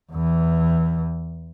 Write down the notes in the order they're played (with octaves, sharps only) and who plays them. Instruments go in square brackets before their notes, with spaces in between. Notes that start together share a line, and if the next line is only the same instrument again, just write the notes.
[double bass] E2 E3